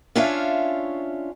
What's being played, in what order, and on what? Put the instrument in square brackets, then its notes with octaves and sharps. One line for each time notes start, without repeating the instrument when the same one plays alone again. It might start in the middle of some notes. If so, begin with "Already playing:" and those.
[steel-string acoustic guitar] C#4 D4 F4 C#5 E5 F5